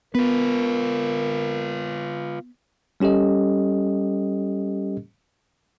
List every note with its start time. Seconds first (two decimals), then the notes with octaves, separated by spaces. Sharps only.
0.15 B3 F4 A#4 B4
3.00 G3 C#4 G4 A4 D#5